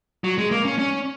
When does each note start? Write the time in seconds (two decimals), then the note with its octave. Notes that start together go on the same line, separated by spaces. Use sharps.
0.24 F#3
0.38 G#3
0.51 A#3
0.65 C#4
0.79 C#4